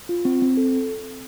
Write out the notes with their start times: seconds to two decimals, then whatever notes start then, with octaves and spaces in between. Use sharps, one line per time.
0.09 F4
0.25 C4
0.42 C4
0.57 A4